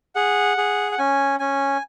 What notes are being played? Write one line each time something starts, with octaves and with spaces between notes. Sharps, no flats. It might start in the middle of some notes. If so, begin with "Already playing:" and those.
G#4 F#5
G#4
F#5
C#4 G#5
C#4 G#5